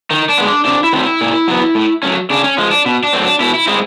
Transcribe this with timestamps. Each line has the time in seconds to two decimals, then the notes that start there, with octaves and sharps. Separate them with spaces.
0.10 D#3 D#4
0.29 D4
0.38 G#3 B3
0.47 D4
0.65 C3 D4
0.84 E4
0.93 D#3 F#3 A3 C4
1.03 E4
1.21 A#2
1.48 F#3 B3
1.75 A2
2.03 F#3 A3 C#4
2.30 C#3 D4
2.44 C#4
2.58 F3 G#3
2.71 D4
2.86 B2
3.03 D4
3.13 F#3 A3 C4
3.22 D4
3.40 B2 E4
3.54 E4
3.67 G#3 C4 E4